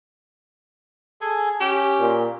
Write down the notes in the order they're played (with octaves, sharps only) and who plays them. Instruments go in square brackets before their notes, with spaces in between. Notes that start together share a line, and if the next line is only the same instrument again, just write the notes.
[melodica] G#4 A4 G#5
[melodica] C#4 [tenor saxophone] G4
[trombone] A#2